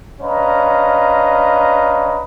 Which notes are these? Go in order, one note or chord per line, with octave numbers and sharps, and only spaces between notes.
C#4 D4 B4 D#5 F5 A#5